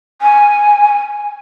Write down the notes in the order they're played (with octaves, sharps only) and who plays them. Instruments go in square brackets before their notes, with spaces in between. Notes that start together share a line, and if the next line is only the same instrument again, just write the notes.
[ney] G#5